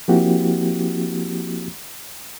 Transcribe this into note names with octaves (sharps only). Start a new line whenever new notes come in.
F3 A#3 C4 E4 F#4 G4